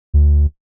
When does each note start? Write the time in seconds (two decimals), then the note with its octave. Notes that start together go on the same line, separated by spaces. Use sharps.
0.14 D2